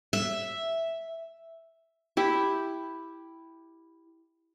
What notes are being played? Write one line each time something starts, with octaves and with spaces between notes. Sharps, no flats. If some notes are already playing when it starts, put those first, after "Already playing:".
E5
E4 G4